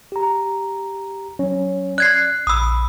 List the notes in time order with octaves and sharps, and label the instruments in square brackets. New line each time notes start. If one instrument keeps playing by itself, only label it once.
[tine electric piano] G4 A#5
F#3 C#4 C#5
[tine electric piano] D5 [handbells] F#6 G#6 C7
[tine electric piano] A#1 B5 [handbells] D#6 E6